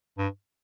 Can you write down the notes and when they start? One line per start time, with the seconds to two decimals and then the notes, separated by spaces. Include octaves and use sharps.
0.18 G2